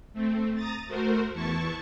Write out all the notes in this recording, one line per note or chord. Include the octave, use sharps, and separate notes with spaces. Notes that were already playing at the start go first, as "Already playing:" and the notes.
A3 C4
A#5 D#6 A6
A3 F#4 A#4 C5
E2 E3 E4 A5 C#6